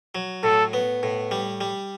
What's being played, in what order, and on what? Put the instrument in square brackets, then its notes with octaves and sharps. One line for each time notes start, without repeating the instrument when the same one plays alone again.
[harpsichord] F#3
[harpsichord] A2 [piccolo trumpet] A4
[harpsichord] B3
A2
G3
G3